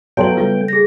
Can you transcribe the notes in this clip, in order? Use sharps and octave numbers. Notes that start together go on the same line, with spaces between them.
F#3 A3 B3 F5 G5 A5 C6 F#7
C#3 G3 F4 A4
G#4 A#6